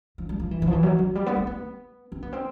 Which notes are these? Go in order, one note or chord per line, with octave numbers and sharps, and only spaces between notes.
F3
G3
F3
E3
E3
F3
E3
F#3
F#3
G3
B3
C4
B3
C4
B3
C4